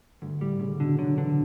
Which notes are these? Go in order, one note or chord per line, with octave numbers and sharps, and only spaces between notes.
D2 G2
A2 G3
D2 C#3
B2 D3
D3 F#3
D3 E3